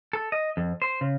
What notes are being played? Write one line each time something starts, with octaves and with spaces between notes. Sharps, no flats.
A4
D#5
F2
C5
C#3